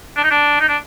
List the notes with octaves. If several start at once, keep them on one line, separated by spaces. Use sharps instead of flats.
D4
D#4
D4
D#4
D4